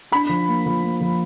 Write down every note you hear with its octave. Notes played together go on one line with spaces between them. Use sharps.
D4 B5
F3
A#3
F3
A#3
F3